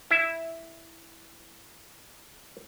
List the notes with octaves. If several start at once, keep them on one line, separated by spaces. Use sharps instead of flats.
E4 E5